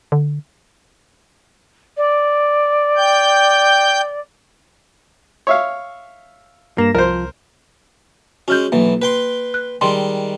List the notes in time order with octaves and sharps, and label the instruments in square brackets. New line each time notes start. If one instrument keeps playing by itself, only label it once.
[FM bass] D3
[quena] D5
[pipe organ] G5 G6
[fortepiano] C#5 E5 F5
[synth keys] G2 A#6 E7 [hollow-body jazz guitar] A#3
[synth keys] C2 [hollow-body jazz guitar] F3 [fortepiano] A#4 C5
[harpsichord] G#3 C#4 [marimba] F#4 F6 G6
[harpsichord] B1 E3 [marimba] A#3
[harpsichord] B4 G5 C6
[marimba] F#6
[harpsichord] D#3 G3 G#3 [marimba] C6